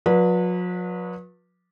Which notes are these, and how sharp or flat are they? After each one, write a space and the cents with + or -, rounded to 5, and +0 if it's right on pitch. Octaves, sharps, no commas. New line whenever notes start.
F#3 -45 B4 -25 D5 +0